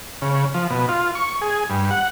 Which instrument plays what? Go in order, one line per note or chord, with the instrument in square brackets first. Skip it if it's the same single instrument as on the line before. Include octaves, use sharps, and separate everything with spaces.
[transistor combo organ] C#3
F3
B2
F4
C#6
G#4
G2
F#5